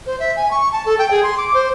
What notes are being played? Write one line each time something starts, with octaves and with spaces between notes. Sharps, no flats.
C5
E5
G#5
C#6
A5
A4
G5
G#4
C6
D6
C5